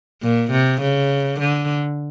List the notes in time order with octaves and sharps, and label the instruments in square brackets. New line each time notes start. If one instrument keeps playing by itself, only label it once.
[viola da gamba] A#2
C3
C#3
D3